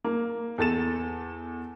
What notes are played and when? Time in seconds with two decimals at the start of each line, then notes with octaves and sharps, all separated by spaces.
0.04 A#3
0.58 E2 A4 A6 E7